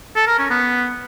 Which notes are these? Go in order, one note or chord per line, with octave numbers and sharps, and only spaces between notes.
A4
A#4
C#4
B3